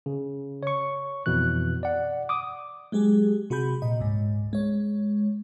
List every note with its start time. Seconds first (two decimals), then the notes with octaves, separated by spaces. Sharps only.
0.06 C#3
0.63 C#5 C#6
1.26 F2 B2 E3 F#6
1.83 D5 F#5
2.29 D6 D#6
2.92 F#3 G#3 G4 G#4
3.50 C3 F#4 G#4 B5 G6
3.82 A#2 D#5
4.00 C#2 G#2
4.53 G#3 C#5